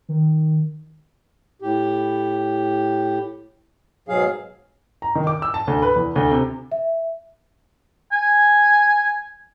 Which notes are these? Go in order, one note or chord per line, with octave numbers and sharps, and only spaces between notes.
D#3
A2 G4
G#2 B2 F#3 G#4 F5
A#5
D#3
D6
E6
A5
D2
B4
E2
D2
C3
E5
G#5